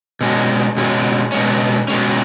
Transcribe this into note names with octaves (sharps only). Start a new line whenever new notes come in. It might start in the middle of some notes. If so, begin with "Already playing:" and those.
B2 G#3 C#4
B2 G#3 C#4
B2 G#3 C#4
B2 G#3 C#4